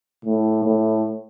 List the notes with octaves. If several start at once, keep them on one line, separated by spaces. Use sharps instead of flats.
A2
A2